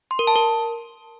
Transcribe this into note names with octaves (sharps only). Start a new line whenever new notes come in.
C6
A#4
A5
A#4